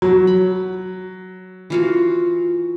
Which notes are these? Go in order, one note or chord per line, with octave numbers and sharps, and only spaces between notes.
F#3
B5
E3 F4 F#4